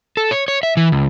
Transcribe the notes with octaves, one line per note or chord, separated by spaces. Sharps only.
A4
C#5
C#5
E5
E3
C#2